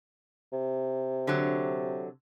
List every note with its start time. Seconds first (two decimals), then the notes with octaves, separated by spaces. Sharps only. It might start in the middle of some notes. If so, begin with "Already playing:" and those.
0.53 C3
1.27 D3 F#3